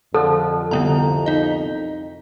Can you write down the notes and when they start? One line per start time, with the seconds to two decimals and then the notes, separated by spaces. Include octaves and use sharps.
0.14 F2 D3 F3 A4
0.71 C2 D3 B3 A#5
1.26 D#4 D#5